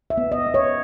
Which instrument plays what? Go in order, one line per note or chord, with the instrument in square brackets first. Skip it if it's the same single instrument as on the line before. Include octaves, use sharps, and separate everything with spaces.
[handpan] E5
B3
D#5
B3
C#5